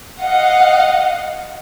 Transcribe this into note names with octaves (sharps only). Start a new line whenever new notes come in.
D#5 F5 F#5